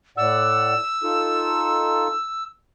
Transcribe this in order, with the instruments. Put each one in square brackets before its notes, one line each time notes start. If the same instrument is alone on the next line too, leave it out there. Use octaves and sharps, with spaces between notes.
[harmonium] A2 D5 F#5 [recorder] E6
[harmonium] D#4 F4 A4